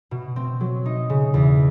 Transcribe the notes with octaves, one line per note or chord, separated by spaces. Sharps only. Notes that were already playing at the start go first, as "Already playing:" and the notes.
B2
C4
F#3
D#4
C#3
E2